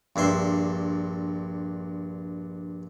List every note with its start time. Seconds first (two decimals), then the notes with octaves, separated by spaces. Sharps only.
0.16 A#1 G2 E5 C6